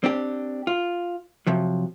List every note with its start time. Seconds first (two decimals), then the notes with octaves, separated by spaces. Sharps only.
0.04 C4 D4 G4
0.67 F4
1.47 C3 F3 F#3